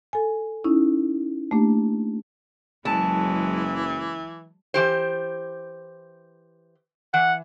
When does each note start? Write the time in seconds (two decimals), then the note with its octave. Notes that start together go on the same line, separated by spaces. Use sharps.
0.13 A4 G#5
0.64 C#4 D#4 E4
1.51 A3 A#3 D4 G4
2.85 F#1 E3 F#3 G#3 A5
4.74 E3 G4 C5
7.14 E3 F#5